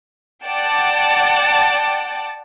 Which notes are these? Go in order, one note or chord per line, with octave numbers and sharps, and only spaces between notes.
D5 F#5 G5 A5